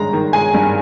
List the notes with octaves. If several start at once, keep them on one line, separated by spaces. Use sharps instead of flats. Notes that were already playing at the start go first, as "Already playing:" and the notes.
Already playing: G2 D#3 G#3 A#5
D#3
G#3 G#5
G2